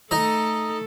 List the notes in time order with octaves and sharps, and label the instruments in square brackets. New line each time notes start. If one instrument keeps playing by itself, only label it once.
[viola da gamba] A3 A4 [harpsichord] D#4 D#5